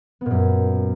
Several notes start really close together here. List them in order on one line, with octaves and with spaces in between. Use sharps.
B3 A#2 F#2